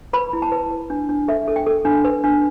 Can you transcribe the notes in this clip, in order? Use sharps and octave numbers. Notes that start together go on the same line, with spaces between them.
B4 B5
E4
A5
B4
B4
D4
D4
A4 E5
A4
G5
A4
D4
B4
D4